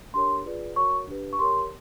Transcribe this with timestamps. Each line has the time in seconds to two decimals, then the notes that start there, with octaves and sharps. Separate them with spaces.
0.14 D4 G4 A#4 C#5 C6
0.45 F4 G#4 B4 D5
0.76 F#4 A#4 C#5 C#6
1.08 D4 G4 B4
1.33 C#6
1.39 G4 A#4 C#5 C6